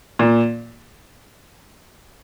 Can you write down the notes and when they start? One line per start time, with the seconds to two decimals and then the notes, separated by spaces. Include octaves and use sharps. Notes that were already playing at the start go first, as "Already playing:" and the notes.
0.19 A#2